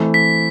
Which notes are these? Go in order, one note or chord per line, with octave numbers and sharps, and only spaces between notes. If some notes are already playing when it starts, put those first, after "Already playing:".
Already playing: E3 A3 C4
B6